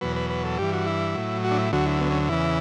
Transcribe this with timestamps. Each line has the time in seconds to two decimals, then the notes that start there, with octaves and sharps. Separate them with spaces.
0.01 E2 B2 F#3 B4
0.16 B4
0.30 B4
0.44 A4
0.58 G2 E3 G4
0.73 F#4
0.86 E4
1.15 A2 F#3
1.44 F#4
1.51 D4
1.58 E4
1.73 D2 D3 F#3 F#4
1.86 E4
2.00 B3
2.10 C#4
2.29 E2 C#3 E3 E4